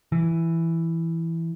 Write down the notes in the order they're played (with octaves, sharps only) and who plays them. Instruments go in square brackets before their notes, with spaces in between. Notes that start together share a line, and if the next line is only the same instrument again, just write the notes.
[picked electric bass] E3